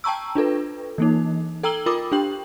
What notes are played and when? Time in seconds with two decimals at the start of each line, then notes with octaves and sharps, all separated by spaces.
0.04 G5 A5 A#5 C#6 E6
0.35 D4 F4 A4 B4
0.98 E3 A#3 D#4
1.63 A4 G5 A#5 E6 F#7 G7
1.86 F4 A#4 B5 D6 D#6
2.12 D4 G4 G5 F#7